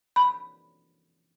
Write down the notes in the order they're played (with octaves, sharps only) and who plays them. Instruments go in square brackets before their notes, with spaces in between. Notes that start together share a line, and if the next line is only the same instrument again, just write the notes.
[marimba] B5